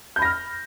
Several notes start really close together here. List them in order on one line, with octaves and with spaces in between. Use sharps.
G6 B5 A#6 F6